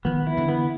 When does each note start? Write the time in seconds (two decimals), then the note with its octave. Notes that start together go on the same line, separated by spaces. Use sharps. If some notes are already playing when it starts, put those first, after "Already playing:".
0.05 D#3 F3 B3
0.27 E4
0.37 D3 E3
0.49 B3